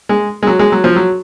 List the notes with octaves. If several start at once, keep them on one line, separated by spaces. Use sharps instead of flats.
G#3
G#3
F#3
G#3
F#3
F3
F#3